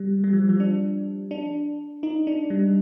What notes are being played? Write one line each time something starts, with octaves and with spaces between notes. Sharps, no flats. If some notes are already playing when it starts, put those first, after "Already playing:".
Already playing: G3
G3
F3
F3
D4
D4
D#4
D4
G3